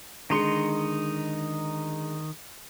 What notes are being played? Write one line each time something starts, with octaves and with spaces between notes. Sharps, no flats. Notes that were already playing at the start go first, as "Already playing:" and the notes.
D3 D#3 G#3 D#4 C6 C#7